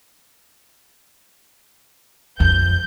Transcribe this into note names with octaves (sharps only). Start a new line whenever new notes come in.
F2 G6